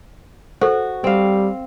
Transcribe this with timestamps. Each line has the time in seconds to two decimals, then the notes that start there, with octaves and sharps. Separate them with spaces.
0.61 F#4 A4 C5
1.04 G3 C4 F5